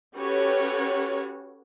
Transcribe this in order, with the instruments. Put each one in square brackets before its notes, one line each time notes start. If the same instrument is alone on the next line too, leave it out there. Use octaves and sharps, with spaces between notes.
[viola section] C#4 F#4 G4 A4 B4 C#5